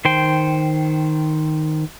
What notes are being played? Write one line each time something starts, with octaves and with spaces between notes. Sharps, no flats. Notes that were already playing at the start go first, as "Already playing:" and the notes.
D#3 C5 G5